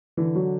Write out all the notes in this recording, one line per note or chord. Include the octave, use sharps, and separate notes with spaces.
D3 E3
F#3